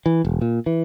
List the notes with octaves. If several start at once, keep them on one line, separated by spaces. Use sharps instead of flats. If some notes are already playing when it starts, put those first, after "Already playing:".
E3
E1
A#2
E3